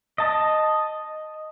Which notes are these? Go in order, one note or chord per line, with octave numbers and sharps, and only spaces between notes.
D#5 A5